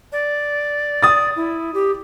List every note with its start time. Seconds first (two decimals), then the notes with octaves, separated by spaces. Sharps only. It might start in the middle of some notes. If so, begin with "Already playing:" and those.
0.12 D5
1.03 D#6 A6
1.36 E4
1.74 G4